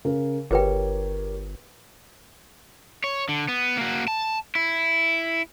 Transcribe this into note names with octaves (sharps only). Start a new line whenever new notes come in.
C#3 A#4
G1 G4 G#4 A#4 B4 C#5 G5
C#5
D3
B3
A#3 F#4
A5
E4